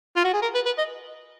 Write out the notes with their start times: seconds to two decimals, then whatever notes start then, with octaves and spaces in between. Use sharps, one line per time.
0.17 F4
0.24 F#4
0.33 G#4
0.42 A#4
0.55 B4
0.66 B4
0.78 D#5